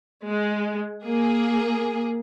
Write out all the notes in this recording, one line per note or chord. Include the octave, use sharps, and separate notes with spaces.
G#3
A#3 G#4